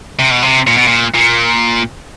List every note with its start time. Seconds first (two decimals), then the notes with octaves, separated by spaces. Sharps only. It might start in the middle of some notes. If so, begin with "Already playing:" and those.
0.19 C3
0.31 B2
0.42 C3
0.67 A#2
0.77 B2
0.87 A#2
1.14 A#2